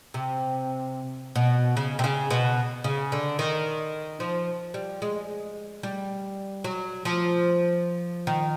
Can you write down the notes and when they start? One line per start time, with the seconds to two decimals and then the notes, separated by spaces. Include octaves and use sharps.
0.14 C3
1.35 B2
1.77 C#3
1.99 C3
2.04 C#3
2.31 B2
2.84 C#3
3.12 D3
3.39 D#3
4.20 F3
4.74 G3
5.02 G#3
5.83 G3
6.64 F#3
7.05 F3
8.27 D#3